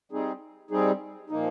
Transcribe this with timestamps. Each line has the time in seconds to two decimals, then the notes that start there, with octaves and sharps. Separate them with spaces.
0.12 G3 C4 D#4 G#4
0.70 G3 C4 D#4 G#4
1.30 A#2 F3 A#3 D#4